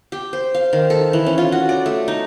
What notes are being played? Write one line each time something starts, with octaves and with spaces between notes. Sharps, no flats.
G4
C5
F5
D#3
A4
E3
C#4
F4
F#4
D5
A3
D#4